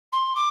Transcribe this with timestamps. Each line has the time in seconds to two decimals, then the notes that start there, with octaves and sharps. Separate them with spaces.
0.12 C6
0.35 D6